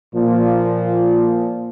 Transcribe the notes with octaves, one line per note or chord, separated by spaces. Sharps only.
A#2 F3